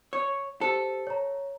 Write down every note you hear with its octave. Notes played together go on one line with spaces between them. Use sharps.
C#5
G4 A4 C5
C#5 A#5